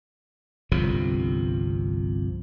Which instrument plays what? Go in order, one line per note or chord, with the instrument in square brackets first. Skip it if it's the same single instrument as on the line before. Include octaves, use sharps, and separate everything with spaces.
[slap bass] G1 C2 C3 F3